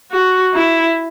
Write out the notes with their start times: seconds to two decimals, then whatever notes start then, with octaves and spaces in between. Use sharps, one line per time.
0.11 F#4
0.54 E4